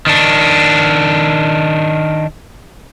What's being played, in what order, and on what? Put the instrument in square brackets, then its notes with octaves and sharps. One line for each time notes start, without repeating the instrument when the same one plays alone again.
[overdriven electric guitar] D#3 D4